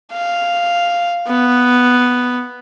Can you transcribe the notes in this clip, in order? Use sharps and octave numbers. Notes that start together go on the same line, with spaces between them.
F5
B3